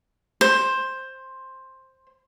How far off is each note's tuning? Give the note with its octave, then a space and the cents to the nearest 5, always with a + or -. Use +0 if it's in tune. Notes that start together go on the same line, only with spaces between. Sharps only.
C5 +10